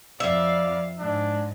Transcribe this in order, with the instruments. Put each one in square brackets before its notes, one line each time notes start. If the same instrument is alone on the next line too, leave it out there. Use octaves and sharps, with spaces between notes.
[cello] F2 F5 [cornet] D5 [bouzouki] E5
[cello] G#2 [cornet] D4